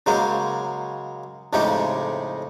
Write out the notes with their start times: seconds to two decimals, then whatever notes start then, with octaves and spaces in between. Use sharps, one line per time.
0.06 C#3 F#3 G#3 A#3 C5
1.53 F2 A2 C#3 G#3 D#4 G4